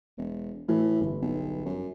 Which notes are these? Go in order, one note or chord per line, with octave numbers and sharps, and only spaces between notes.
E1
A2 E3 A3
G1
B1
F#2